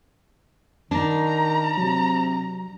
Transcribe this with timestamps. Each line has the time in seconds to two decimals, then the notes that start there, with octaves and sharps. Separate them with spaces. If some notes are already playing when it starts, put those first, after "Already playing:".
0.91 D#3 D4 A#5
1.77 C3 F#3